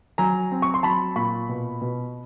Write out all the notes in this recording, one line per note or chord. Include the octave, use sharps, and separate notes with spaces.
F#3 G#5 A#5
C4
C#6
C6
F#3 A5 B5
A#2 B5 C#6
B2
B2